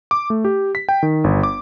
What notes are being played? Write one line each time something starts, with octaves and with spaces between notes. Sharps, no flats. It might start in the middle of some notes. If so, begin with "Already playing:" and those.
D6
A3
G4
B6
G5
D#3
G1
D6